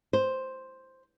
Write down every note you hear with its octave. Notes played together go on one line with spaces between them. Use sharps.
C5